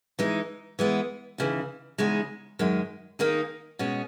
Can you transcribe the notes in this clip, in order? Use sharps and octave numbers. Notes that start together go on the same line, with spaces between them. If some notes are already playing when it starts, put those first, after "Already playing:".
E3 G#3 D#4 G#4
E3 G#3 B3
D#2 C#3 E3
E2 C#3 G#3 D#4 G#4
F#2 D#3 G#3
D#3 A#3 D#4 G#4
B2 G#3 C#4